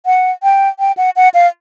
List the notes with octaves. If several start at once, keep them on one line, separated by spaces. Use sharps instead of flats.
F#5
G5
G5
F#5
F#5
F5